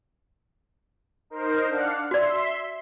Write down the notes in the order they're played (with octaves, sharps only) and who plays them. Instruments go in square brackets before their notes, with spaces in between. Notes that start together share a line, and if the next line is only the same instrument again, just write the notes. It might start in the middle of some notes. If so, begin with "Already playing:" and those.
[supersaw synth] D#4 A#4 C5
D4 F5 F#5
[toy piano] F#4 D5 [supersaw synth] E5 C6